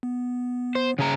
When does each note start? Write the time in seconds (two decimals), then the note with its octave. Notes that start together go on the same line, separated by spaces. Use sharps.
0.03 B3
0.75 C5
0.98 C#3 G#4 A#5